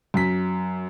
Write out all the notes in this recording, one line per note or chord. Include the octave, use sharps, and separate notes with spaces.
F#2 B6